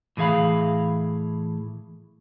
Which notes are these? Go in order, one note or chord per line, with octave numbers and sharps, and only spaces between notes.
A2 E3 G#4 F5 B5